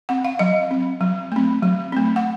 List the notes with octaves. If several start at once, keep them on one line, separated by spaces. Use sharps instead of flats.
C4 F#5
F5
F#3 D#5
C4
F#3
A3 C4
F#3
A3 C4
F#5